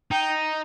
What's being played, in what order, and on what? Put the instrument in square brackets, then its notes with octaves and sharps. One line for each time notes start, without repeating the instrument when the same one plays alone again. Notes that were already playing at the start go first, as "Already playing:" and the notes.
[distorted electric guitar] D#4 [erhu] G5